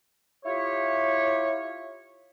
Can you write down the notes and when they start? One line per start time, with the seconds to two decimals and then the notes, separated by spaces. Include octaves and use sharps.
0.46 E4 F4 G4 C#5